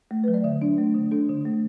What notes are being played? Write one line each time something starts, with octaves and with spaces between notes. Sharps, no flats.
A3
F#3 B4
D5
D3 E5
D4
A3
D3
D4 A4
D3
A3